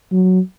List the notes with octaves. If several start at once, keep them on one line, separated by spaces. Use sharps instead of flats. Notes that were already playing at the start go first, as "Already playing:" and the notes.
F#3